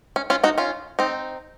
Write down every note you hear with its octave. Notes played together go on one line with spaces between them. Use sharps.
C#4
C#4 F4
D#4 F#4
C#4 F4
C4 D#4